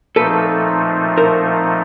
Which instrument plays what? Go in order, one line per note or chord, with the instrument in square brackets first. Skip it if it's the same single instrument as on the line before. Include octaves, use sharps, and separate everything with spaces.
[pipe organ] A#2 F3 A3 C4 D#4 [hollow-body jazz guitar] A4 B4
[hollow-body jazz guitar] A#4 C5